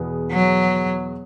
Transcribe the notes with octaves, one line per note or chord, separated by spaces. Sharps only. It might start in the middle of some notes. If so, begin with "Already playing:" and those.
Already playing: E2 B2 B3 G#4
F#3